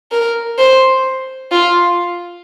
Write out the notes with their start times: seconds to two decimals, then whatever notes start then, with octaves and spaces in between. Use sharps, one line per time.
0.11 A#4
0.58 C5
1.51 F4